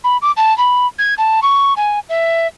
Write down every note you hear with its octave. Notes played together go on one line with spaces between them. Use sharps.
B5
D6
A5
B5
G#6
A5
C#6
G#5
E5